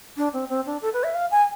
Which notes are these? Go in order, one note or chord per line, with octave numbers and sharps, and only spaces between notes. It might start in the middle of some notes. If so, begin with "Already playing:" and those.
D4
C4
C4
D4
A4
B4
E5
F5
G#5